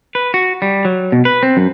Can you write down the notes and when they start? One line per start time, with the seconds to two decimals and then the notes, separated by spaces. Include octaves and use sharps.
0.15 B4
0.34 F#4
0.62 G3
0.85 F#3
1.12 B2
1.25 B4
1.43 C4
1.57 F#2